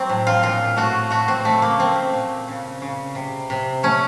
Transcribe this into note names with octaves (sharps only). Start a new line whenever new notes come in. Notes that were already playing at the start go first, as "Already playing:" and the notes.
Already playing: F#3 C4
A2
F4
A#2 F4
A3 F#4
A3 F#4
C4
C#3 A3
A#3
A3 C4
A#2
C#3
C#3
C3
C3
A3 C#4